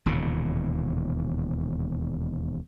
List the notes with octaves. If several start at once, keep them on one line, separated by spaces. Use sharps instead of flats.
E1 D#2 A#2 C#3